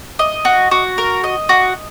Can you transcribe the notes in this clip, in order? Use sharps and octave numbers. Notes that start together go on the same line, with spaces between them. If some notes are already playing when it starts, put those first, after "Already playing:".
D#5
F#4
F#4
A#4
D#5
F#4